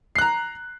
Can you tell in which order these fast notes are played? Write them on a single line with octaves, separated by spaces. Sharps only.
C7 F#6 A#5